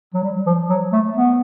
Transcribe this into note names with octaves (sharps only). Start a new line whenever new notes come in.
F#3
G3
F3
F#3
A3
B3